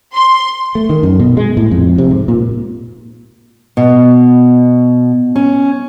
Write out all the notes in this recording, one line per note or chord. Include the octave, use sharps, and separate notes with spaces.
C6
A3
D#3
F#2
B2
G#3
A2
F2
C3
G#2
A#2
B2
C#4